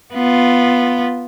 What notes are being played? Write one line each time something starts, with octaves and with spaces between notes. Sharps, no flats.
B3 F4